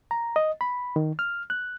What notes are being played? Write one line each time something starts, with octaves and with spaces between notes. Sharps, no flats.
A#5
D#5
B5
D#3
F6
F#6